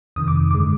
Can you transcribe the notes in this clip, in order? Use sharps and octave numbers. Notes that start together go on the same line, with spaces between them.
F2 C3 D#3 D#6
D6
G2 D3 G#3 D6